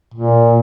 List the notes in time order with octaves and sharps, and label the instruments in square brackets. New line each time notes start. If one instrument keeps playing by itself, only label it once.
[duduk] A#2